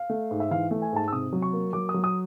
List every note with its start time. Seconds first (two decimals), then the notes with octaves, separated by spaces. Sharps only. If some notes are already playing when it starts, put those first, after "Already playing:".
Already playing: F5
0.10 A3
0.31 G#2
0.40 E5
0.51 E3 F5
0.71 A3
0.82 G#5
0.92 G#2 A5
1.08 E6
1.12 C3 D#6
1.33 F#3
1.42 C#6
1.53 A#3
1.73 F#3 D6
1.89 D#6
1.94 F#3
2.04 D#6